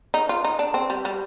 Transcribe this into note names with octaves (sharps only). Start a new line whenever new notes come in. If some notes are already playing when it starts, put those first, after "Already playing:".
D#4
F4
D#4
D4
C4
G3
G3